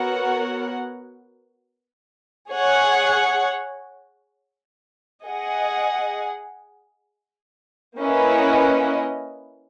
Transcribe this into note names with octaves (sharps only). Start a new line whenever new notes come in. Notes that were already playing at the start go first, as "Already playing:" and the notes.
Already playing: B3 F#4 A#4 C#5 F#5
G#4 C#5 F#5
G#4 D#5 F#5
A#3 C#4 E4 B4 D#5